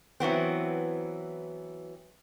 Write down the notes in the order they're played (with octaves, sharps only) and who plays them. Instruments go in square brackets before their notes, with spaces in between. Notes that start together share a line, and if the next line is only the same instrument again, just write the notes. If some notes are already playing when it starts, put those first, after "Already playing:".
[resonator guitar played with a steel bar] E3 F#3 B3 C4